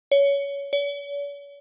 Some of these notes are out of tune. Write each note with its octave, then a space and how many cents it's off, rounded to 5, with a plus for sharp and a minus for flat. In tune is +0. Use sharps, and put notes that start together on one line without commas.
C#5 +20
C#5 +45